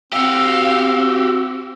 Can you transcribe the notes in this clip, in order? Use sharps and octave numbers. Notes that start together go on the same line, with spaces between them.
C4 F#4 G4 F5 E6